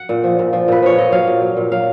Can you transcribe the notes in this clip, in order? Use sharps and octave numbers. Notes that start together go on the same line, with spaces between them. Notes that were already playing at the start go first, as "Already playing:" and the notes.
Already playing: F#5
A#2
F3
A#2
F3
A#2 B4
F3 C#5
A#2 D#5
F#3 F5
A#2
F#3
A#2
F#3 F5